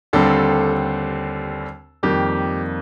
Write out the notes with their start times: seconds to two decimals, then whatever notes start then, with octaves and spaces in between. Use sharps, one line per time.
0.13 D#2 D3 G3 C4 A4
2.03 F2 D#3 G3 A#3 G4